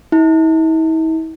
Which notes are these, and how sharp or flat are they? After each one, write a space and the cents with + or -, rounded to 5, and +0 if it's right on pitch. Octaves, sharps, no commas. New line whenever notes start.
E4 -45